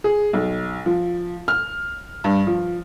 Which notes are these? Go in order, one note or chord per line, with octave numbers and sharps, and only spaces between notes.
G#4
B1
F3
F6
G2
F3